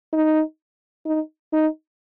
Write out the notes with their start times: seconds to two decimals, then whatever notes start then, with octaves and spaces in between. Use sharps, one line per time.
0.13 D#4
1.06 D#4
1.53 D#4